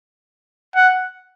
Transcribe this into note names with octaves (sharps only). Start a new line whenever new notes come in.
F#5